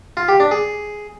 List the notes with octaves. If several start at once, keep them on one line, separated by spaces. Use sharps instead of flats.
F4
G4
D4
G#4